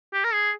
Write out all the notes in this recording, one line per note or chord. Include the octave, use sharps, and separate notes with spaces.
G4
A#4
G#4